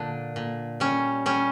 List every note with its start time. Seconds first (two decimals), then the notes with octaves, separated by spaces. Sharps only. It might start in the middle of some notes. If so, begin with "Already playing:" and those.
Already playing: A#2 D3 D4
0.36 A#2
0.80 G3 C#4
1.26 G3 C#4